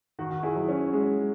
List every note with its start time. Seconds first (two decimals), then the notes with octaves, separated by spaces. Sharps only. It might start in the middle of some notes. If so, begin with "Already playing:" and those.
0.19 D#3 F#4
0.31 F#4
0.43 E4 G#4
0.55 F#3
0.68 C#4
0.93 G#3